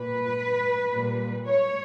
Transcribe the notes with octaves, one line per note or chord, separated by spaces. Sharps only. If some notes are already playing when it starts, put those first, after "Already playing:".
Already playing: A#2 B4
A#2 G3
C#5